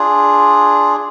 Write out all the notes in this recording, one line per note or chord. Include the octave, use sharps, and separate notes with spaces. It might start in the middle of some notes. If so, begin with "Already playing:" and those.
Already playing: D4 F4 G#4